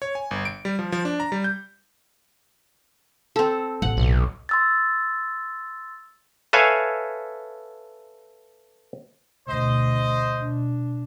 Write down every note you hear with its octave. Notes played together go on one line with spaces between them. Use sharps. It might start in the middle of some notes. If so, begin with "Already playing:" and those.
C#5
G#5
G1
D7
G3
F3
F3
D4
A#5
G3
G6
C4 A4
A1 F#5
B1
C6 E6 A6
A4 B4 C#5 E5 F5 G#5
D2 B2 C5 D#5
B2 D4